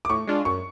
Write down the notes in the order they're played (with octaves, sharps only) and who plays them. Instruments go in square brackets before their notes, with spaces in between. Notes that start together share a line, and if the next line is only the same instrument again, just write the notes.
[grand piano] D6
[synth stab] A2 [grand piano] C#6
[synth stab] G#3 D4 F4
[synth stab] F#2 [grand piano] C#6